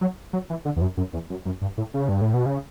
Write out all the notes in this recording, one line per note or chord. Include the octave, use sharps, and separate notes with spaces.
F#3
F#3
E3
D3
E2
F#2
F#2
E2
F#2
F#2
G2
A2
C#3
G2
A2
B2
C#3